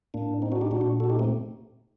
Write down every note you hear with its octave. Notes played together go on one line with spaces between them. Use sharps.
A2 A#3 D4
C4 D#4
D4 F#4
D#4 G4
A#2 D4 F#4
D4 F#4
F#4 A4
D#4 G4
A3 C4